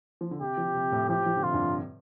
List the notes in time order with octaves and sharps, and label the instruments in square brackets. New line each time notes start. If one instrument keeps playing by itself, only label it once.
[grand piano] F3
D3
[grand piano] C3 [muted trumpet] G4
[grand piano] F3
C3
A2
[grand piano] F3 [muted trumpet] G4
[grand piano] F3
D3
[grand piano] C3 [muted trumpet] F4
[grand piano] G2
F2